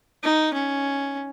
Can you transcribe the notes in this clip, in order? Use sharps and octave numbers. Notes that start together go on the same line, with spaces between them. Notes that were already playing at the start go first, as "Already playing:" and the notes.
D#4
C#4